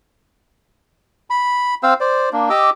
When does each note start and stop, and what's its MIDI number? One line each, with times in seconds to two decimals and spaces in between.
1.30 1.75 83
1.83 1.94 60
1.83 1.94 72
1.83 1.94 77
1.83 1.94 88
2.00 2.29 72
2.00 2.29 74
2.33 2.49 58
2.33 2.49 62
2.50 2.70 67
2.50 2.70 75
2.50 2.70 86
2.50 2.70 88